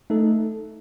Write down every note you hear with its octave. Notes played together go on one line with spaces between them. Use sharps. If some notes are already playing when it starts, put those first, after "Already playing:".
A3 D#4 A4